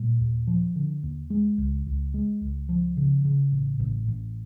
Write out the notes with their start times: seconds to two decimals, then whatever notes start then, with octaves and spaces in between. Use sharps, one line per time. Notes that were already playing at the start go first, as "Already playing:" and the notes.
Already playing: A#2 G3
0.20 D#2
0.47 F3
0.76 D3
1.03 D#2
1.30 G#3
1.58 C#2
1.87 C#2
2.14 G#3
2.41 C#2
2.69 F3
2.97 C#3
3.25 C#3
3.52 A1
3.80 A1
4.08 A1